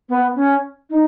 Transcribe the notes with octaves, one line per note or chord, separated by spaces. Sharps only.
B3
C#4
D#4